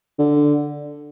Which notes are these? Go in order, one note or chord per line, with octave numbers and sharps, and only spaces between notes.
D3